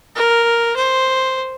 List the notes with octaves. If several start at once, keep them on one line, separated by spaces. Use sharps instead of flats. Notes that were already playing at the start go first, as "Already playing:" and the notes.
A#4
C5